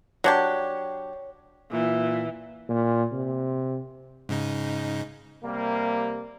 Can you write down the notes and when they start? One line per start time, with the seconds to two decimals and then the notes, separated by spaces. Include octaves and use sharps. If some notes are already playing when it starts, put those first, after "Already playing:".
0.24 F#3 D4 G4 C#5
1.72 A#2 E3
2.69 A#2
3.12 C3
4.29 G#2 C#3 D#4
5.44 C3 G3 A#3